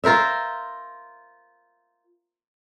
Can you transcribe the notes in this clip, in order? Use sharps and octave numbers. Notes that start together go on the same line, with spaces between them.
F4 A#4 C5 E5